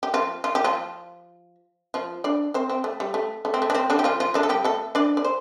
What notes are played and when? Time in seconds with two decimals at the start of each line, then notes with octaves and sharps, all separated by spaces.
0.03 G4
0.14 F3 F4
0.44 F4
0.55 G4
0.64 F3 F4
1.94 F3 F4
2.24 D4 D5
2.54 C4 C5
2.70 C4
2.84 A3
3.00 G3
3.14 A3
3.45 A3
3.54 C4
3.62 A3
3.70 D4
3.75 C4
3.90 D3 D4
3.99 G4
4.04 F3 F4
4.20 F3 F4
4.34 D3 D4
4.43 A4
4.49 G3 G4
4.64 A3 A4
4.95 D4 D5
5.17 D5
5.24 C5